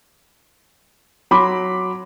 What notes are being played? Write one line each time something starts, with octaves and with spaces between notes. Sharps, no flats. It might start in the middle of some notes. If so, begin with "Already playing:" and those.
F#3 B5 C6 D6